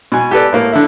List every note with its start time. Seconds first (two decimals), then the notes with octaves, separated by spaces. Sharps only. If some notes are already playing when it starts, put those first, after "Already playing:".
0.12 B2 G#5
0.31 G4 A4 B4 D5
0.53 A2 A#3
0.72 D3 E4